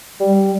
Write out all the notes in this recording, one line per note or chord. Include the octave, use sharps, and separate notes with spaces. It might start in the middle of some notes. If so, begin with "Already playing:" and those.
G3